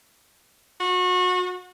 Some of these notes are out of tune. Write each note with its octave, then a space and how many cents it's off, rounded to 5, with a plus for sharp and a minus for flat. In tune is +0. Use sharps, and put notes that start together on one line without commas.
F#4 -30